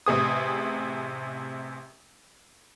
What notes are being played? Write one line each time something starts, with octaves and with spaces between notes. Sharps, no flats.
A1 C3 G#4 D#6